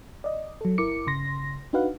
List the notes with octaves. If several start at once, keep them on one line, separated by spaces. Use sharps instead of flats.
D5 D#5
F#3 A4
G1 E4 A#4 D6 C#7
G1 C#3 C6 A#6
D4 D#4 F#4 B4 F5 F#5